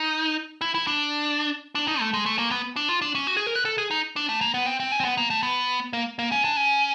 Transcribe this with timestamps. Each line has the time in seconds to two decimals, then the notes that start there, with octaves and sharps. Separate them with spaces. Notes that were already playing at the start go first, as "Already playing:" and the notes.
Already playing: D#4
0.61 E4
0.75 E4
0.87 D4
1.75 D4
1.88 D#4
2.00 A3
2.14 G#3
2.26 A3
2.39 A#3
2.51 B3
2.76 D4
2.89 F4
3.02 D4
3.15 C#4
3.27 F#4
3.37 G#4
3.47 A#4
3.56 B4
3.65 A4
3.78 G#4
3.91 D#4
4.16 D4
4.29 A3
4.41 A#3
4.54 B3
4.66 C4
4.80 C4
4.92 C#4
5.00 C4
5.05 B3
5.18 A#3
5.30 A3
5.43 B3
5.93 A#3
6.19 A#3
6.32 C#4
6.44 D4
6.56 C#4